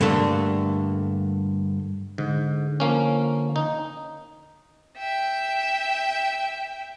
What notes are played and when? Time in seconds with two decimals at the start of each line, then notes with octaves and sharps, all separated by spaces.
0.01 G2 D3 A3 A#3
2.18 G#2 D3
2.80 F3 A#3 C#4
3.56 D#4
4.97 E5 G5